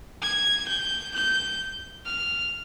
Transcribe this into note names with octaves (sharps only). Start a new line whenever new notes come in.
G#6
G6
G6
F6